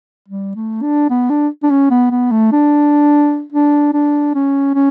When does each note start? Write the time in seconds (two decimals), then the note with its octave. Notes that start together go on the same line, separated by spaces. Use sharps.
0.28 G3
0.55 A3
0.82 D4
1.10 B3
1.30 D4
1.63 D4
1.70 C#4
1.90 B3
2.11 B3
2.31 A3
2.52 D4
3.52 D4
3.93 D4
4.35 C#4
4.74 C#4